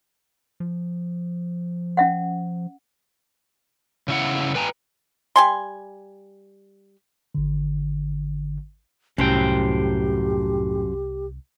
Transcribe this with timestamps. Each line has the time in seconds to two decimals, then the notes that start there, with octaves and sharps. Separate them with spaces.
0.60 F3
1.97 C#4 E5 F#5
4.08 C#3 E4 F#5
4.55 B4 G5 G#5 A#5
5.36 G3 G#5 C6
7.35 G#1 D3
9.18 C2 F#2 A2 C#4 G4 C5 G5